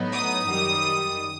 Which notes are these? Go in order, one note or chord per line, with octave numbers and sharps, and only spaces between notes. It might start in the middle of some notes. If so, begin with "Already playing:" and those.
Already playing: A2 F#3 B3 D#4
D#6
F#2 D#3 G3